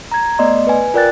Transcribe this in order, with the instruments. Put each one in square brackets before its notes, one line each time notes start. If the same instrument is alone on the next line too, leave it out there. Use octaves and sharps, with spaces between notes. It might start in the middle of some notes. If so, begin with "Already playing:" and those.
[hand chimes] A#5 G#6
A3 B3 D5 D#5 C6
B4 G#5
F4 A#4 D5 G5 F#6 A6